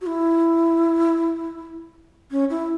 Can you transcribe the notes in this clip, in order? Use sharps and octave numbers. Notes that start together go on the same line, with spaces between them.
F#4
E4
C#4
E4